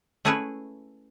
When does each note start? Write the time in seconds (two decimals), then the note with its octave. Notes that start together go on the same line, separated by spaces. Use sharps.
0.25 A3 C#4 E4 G#4 B4